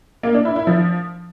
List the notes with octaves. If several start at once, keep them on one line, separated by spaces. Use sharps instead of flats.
A#3
D4
E4
E4
F3